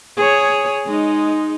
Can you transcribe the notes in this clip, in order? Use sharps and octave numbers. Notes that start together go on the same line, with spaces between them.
G#4 C#5
G#3 D#4